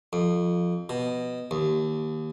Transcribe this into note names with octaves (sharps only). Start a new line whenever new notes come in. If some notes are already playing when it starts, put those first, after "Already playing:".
F2
B2
D#2